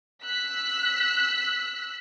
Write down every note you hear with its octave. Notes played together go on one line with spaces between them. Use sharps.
E6 F#6 B6